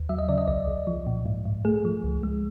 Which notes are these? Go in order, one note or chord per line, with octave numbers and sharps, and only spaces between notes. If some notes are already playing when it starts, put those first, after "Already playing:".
Already playing: D#2
F#3 E5
D#5
C#3 D5
D#5
C2 D5
C2
F3
A#2
G#2
G#2
A3 G#4
F3
C#2
G#3